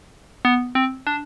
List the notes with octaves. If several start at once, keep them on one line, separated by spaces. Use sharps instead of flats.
B3
C4
D4